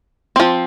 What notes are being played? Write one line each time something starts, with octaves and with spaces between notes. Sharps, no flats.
F3 C4